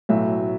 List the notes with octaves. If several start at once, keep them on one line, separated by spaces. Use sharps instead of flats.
B1 A2 F#3 E5